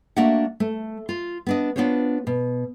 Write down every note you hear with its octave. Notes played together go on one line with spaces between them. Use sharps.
A3 A#3 D4 F#4 E5 F#5
A3
F4
B3 D4 D#5
B3 D4 F4 C5 C#5
B2